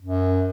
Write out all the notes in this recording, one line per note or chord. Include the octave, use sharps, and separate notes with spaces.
F#2